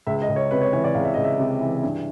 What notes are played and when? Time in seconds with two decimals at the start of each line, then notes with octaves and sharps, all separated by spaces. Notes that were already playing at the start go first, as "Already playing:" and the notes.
0.07 C#2 E5
0.22 D#5
0.29 C#2
0.36 C#5
0.51 C3 B4
0.61 C#5
0.73 E3 C#5
0.84 D5
0.95 C#2 F5
1.05 E5
1.14 C#2 D#5
1.24 E5
1.39 C3
1.61 E3
1.83 G2